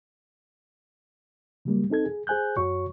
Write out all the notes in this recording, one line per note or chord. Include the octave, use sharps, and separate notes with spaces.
C#3 F#3 G3 A#3
C4 D#4 A4 G#6
G#4
G#4 C5 G#5 F#6 G6
F#2 F#4 C#5 C#6